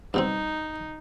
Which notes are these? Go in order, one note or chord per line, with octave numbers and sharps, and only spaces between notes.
G2 B2 C4 D#4